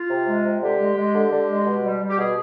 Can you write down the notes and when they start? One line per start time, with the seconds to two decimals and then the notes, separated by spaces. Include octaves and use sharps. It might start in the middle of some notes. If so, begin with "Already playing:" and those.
Already playing: F4
0.09 C3
0.27 G#3
0.44 C3
0.62 D3 G4
0.80 G#3
0.96 G#3
1.15 D3
1.32 D3
1.49 G#3
1.66 B2
1.83 G3
2.01 G3
2.10 G4
2.18 B2 G#4